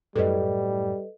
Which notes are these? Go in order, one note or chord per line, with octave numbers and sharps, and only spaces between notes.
F#2 A2 G3 A4 B4 D#5